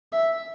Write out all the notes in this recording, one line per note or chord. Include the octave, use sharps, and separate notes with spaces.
E5